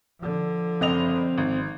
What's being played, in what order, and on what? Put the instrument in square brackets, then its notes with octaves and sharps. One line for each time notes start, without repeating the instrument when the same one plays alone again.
[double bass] D3 F3
[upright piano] F#1 D#5 F7 [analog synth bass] C4
[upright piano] G#1